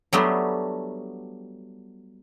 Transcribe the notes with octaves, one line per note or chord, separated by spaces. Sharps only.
F#3 G3 A3 B3 D4 G4